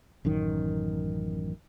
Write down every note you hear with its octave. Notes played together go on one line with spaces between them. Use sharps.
A1 F#2 D#3